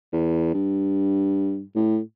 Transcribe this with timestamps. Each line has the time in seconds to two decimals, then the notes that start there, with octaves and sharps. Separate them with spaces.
0.13 E2
0.54 G2
1.75 A2